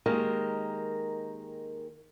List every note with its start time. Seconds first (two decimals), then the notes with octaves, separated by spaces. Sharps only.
0.06 D#3 G#3 A#3 G4 A#4